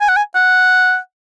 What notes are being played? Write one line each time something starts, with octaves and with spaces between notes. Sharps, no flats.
G#5
F#5
G#5
F#5